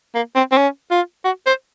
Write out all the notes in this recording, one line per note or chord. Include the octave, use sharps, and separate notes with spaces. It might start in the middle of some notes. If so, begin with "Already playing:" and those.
A#3
C4
C4
C#4
F4
F#4
C5